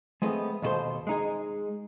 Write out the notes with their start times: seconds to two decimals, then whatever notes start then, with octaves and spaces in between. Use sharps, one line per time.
0.22 G#3 A3 B3 C4 D#5
0.62 D#2 B2 D4 A4 C5
1.07 G#3 D#4 G#4